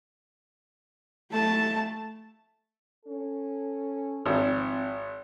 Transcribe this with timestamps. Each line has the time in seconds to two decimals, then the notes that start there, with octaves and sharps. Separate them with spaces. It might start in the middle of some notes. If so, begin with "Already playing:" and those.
1.32 A3 A5
3.06 C#4 A4
4.26 G#1 F3 C4